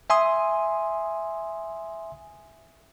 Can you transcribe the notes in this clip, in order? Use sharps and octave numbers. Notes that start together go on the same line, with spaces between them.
E5 G#5 C6 D#6